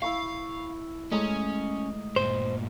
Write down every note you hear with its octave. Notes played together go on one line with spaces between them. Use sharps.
E4 F5 B5 C#6
G#3 A3 C#4 D#5 A#5
G2 A#2 C5